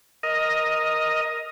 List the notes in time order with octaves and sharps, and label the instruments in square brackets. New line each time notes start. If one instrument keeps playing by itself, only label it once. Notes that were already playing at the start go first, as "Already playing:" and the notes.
[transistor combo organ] A#4 D#5